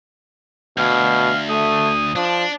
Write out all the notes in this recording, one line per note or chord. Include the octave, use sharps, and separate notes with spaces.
D2 B2 F5
A3 D#6
F3 D4